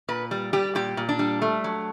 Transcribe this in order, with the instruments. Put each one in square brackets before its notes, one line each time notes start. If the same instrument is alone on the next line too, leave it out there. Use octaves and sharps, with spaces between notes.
[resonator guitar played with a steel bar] A#2 B4
G3
G3 G4
A#2 G4
A#2
D4
G3
A3
F#3